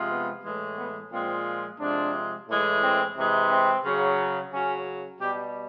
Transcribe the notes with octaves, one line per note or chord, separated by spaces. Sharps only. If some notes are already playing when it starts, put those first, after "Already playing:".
Already playing: C3 F3 G#3
B3
A2 E3 G#3
B3
A#2 F3 G#3 C4
C3 F3 G#3 D4
A2 E3 G#3
C4
C3 E3 G#3
C4
C#3 F#3
C#3 F#3 C#4
B2 G3 G4